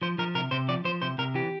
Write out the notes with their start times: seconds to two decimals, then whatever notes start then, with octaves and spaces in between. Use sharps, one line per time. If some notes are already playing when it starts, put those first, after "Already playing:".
0.02 F3 C5
0.18 F3 A#4
0.35 C3 A#4
0.51 C3 C5
0.68 F3 D5
0.85 F3 C5
1.02 C3 C5
1.18 C3 A#4
1.34 E3 G4